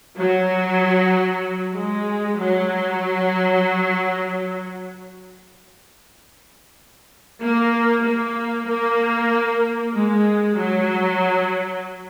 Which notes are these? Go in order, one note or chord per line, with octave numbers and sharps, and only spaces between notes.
F#3
G#3
F#3
A#3
A#3
A#3
G#3
F#3